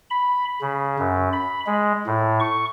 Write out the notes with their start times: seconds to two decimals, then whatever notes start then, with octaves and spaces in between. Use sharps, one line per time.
0.10 B5
0.61 C#3
0.99 F#2
1.33 B5
1.67 G#3
2.07 A2
2.40 C#6